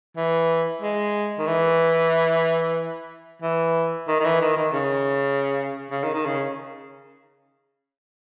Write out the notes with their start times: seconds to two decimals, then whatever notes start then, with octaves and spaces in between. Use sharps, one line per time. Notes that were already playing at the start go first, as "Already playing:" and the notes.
0.16 E3
0.82 G#3
1.39 D#3
1.47 E3
3.42 E3
4.08 D#3
4.20 D#3
4.25 E3
4.41 D#3
4.57 D#3
4.73 C#3
5.91 C#3
6.04 D#3
6.14 D#3
6.26 C#3